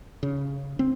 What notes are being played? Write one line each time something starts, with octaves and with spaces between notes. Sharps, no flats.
C#3
C4